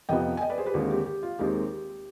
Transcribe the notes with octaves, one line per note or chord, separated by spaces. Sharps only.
F2 C3 F3 B3 D#5 G5
G#5
D#5 G5
B4 D5
G#4 C5
G4 B4
D#2 D3 G#3 C4 F4 G#4
G4
G4
F4
D#2 D#3 G#3 C4 G4